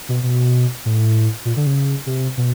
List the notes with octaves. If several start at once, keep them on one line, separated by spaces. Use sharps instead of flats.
B2
B2
A2
A#2
D3
C#3
C3
B2